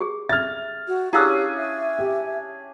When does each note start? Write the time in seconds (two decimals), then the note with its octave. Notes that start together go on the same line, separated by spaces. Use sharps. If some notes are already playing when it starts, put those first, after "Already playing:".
0.01 G4 G#4
0.29 E5 F6 G#6 A6
0.88 F#4
1.13 C#4 D4 E4 G4 G#4 F5 E6
1.57 E5
1.99 G4